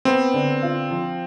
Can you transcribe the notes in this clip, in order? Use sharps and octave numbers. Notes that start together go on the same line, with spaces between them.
B3 C4
D3
F4
F3